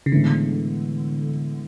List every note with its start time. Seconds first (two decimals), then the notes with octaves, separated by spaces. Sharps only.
0.06 C#3
0.12 A2 D3 E3 G#3 B3 E4